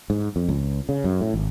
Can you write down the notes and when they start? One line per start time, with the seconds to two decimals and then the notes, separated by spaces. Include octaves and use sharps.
0.10 G#2
0.36 F2
0.49 C#2
0.89 C#3
1.04 F#2
1.21 A2
1.34 G#1